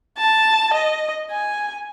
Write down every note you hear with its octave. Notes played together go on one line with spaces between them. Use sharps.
A5
D#5
G#5